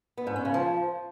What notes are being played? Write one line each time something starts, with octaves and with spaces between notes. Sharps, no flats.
B3
G#2
C#4
C#3
F3